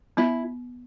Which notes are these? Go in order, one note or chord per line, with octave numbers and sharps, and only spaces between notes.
B3 E4